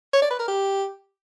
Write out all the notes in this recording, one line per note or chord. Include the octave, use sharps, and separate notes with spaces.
C#5
D5
B4
A#4
G4